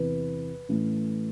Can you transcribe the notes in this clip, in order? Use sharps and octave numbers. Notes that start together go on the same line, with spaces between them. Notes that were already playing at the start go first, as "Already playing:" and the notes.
Already playing: E2 C3 E3 B4
A2 E3 A3 C#4